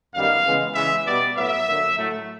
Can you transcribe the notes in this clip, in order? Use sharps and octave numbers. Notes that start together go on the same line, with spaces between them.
F#2 D#3 G3 B3 F5
C#3 E3 G#3 B3
C#3 E3 G#3 B3 E5
B2 G3 B3 D5
A2 F#3 B3 E5
D3 F#3 A#3
A2 F#3 A3